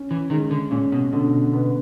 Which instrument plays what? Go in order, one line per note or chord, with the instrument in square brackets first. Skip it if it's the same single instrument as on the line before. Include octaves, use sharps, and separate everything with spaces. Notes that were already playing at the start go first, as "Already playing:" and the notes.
Already playing: [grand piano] C#4
[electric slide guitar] E3
[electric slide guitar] D#3 [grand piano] G#3
[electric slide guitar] D3
[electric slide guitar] A#2 [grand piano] C#4
[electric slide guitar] B2
[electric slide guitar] B2 [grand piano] D3
[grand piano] B3